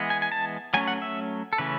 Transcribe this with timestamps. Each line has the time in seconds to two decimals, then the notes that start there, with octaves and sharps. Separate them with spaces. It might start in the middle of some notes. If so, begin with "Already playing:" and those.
Already playing: E3 G#3 B3
0.10 G#5
0.22 G#5
0.32 A5
0.74 F#3 A3 C#4 G#5
0.87 F#5
1.02 E5
1.53 A4
1.58 C#3 E3 A3 C#4 B4